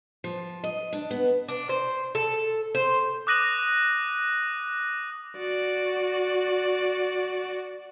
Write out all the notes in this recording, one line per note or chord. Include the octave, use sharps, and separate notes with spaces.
F3
D#5
D4
B3
D4
C5
A4
C5
D6 D#6 F#6 A#6 D#7 F#7
F#4 D5